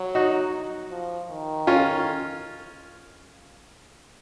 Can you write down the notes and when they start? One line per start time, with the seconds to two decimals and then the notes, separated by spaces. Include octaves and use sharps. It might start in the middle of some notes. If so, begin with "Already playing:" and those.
Already playing: F#3
0.15 D#4 F#4
0.91 F3
1.30 D#3
1.67 C#4 F4